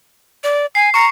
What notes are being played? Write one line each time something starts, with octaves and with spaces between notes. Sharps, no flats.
D5
G#5 C7
A#5 C#6 C7 C#7